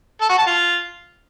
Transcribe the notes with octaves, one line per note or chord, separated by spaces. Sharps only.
A4
F#4
A5
F4